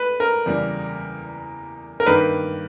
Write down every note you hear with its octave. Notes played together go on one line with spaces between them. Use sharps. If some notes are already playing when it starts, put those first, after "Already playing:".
Already playing: B4
A#4
E2 C#3 G3 A#3
A#4
G2 D#3 A#3 B4